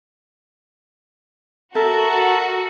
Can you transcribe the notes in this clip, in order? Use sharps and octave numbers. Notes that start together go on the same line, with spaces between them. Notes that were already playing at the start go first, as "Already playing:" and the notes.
F#4 A4 A#4 E5 A5